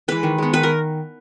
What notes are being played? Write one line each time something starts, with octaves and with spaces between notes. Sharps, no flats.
E3 G#3 B4
D#3
G#3 B3
D#3 B4
A#4